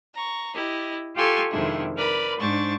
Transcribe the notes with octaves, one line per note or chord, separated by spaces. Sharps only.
A#5 C#6
E4 G4 D#5
F4 G4 A4 G#5 C6 C#6
F2 C3 D#3 G#3 D4 E4
A#4 B4 D5 B5
G#2 D4 C5 C#6 A6